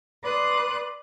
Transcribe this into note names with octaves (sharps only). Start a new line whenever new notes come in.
B4 D5 C6 D6 D#6 F#6